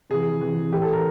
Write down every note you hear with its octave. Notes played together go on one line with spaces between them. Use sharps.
C3 E3 G#4
C3 E3
A2 E3 G4
A4
A#4